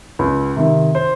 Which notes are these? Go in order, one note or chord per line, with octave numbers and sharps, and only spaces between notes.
C#2
C3 D#3
C5